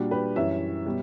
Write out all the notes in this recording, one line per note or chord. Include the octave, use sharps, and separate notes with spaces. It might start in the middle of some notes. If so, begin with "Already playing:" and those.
Already playing: A#2 G3 D4 F#4
G4 B4
F#2 E3 G3 C#5 E5
B2 G3